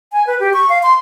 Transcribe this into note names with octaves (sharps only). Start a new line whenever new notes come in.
G#5
B4
G4
C#6
F5
C6